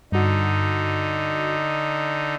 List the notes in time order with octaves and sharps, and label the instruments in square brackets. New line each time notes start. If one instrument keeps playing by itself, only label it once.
[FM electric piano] G2 F#4 [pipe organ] D3 D#4